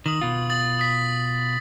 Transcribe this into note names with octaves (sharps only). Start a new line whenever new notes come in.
D#3 D#6 F#7
B2 F4
D#6 A6 F#7
D#6 B6